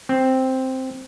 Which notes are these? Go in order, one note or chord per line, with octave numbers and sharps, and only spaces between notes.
C4